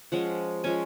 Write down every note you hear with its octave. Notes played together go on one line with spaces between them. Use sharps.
F3 G#3 C#4 F#5
F3 G#3 C#4 G#5